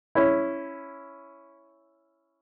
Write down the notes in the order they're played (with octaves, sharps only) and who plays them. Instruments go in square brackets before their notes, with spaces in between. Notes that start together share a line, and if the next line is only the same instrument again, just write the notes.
[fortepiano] C#4 E4